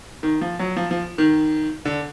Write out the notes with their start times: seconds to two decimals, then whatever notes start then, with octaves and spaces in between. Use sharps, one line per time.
0.23 D#3
0.41 F3
0.59 F#3
0.76 F3
0.91 F3
1.18 D#3
1.85 D3